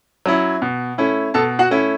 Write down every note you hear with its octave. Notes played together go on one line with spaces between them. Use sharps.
F#3 C#4 E4
B2
A3 C#4 E4
B2 A4 A5
F#4 F#5
A3 C#4 E4